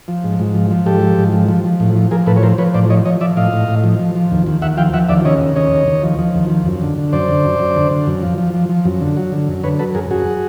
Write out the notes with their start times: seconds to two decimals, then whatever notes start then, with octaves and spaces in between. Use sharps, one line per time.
0.08 F3
0.24 G#2
0.39 G#2
0.54 F3
0.70 F3
0.86 G#2 G4 A4
1.02 F3
1.18 G#2
1.33 F3
1.49 F3
1.64 F3
1.80 A2
1.95 F3
2.11 F3 G#4 A#4
2.27 A2 A4 B4
2.36 C#5
2.43 F3 A#4 C5
2.58 F3 B4 C#5
2.74 A2 C5 D5
2.89 F3 C#5 D#5
3.05 F3 C#5 D#5
3.21 F3 D5 E5
3.37 A2 D#5 F5
3.53 A2
3.68 A2
3.84 F3
3.99 F3
4.15 F3
4.31 D#2
4.46 D#2
4.62 D#2 E5 F#5
4.77 F3 F5 G5
4.94 F3 E5 F#5
5.09 D#2 D5 E5
5.25 C#3 C#5 D#5
5.41 D#2
5.56 C#3 C#5 D#5
5.72 D#2
5.88 D#2
6.03 F3
6.19 F3
6.35 D#2
6.50 F3
6.66 F#2
6.82 D3
6.98 D3
7.13 F#2 C5 D5
7.28 D3
7.45 F#2
7.59 F#2
7.76 D3
7.91 D3
8.07 F#2
8.23 F3
8.38 F3
8.54 F3
8.69 F3
8.85 F#2
9.01 D3
9.17 F#3
9.32 D3
9.48 F#2
9.63 D3 B4 C#5
9.79 F#3 A4 B4
9.95 F#2 G#4 A#4
10.10 F#2 F#4 G#4